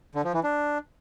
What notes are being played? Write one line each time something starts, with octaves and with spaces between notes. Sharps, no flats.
D3
F3
E3
D4